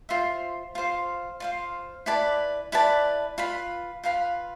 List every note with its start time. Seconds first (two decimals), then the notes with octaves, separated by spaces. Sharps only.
0.09 F4 C5 E5
0.75 F4 C5 F5
1.40 F4 C5 F5
2.06 E4 B4 D5 A5
2.72 E4 B4 D5 A5
3.38 F4 B4 F5 B5
4.04 F4 B4 F5 B5